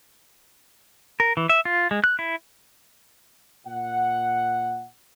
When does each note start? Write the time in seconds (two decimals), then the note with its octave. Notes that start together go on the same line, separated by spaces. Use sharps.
1.20 A#4
1.37 E3
1.49 E5
1.65 F4
1.91 G#3
2.04 F#6
2.19 E4
3.66 A#2 F#5